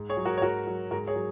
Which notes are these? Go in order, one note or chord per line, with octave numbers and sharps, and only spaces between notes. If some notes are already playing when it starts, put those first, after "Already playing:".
Already playing: G#2
G#4 C#5
F#3
F#4 A#4
C#5
G#2 F#4 A#4
F#3
G#2 F#4 A#4
G#4 C#5
F#3